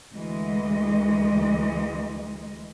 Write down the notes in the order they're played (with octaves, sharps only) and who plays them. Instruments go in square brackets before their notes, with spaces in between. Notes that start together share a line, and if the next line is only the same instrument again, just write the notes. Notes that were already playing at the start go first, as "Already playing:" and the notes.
[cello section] D2 E3 G#3 D#5